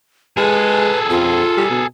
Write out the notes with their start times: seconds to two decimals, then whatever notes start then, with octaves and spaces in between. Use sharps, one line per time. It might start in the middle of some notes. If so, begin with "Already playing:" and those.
0.37 G#3 G#4 A4 B4
1.09 F2 F4
1.57 G3
1.70 B2